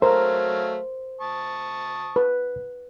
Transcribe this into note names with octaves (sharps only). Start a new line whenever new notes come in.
F#3 A3 A#4 C5 F5
A5 C#6 D#6
B4